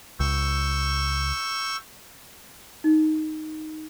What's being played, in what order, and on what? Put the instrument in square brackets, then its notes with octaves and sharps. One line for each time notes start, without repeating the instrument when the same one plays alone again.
[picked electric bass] C#2 [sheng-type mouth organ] C#6 E6 G6
[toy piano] D#4